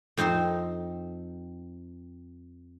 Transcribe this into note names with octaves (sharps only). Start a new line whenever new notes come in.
F2 C4 D#4 C5 C6